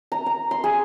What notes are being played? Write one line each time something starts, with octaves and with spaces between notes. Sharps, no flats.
A#5
A#5
C6
G#4